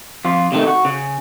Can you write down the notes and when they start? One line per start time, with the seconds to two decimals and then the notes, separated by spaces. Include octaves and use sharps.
0.25 F2 F4
0.52 C3 D#3 A3
0.67 F#4
0.85 C#3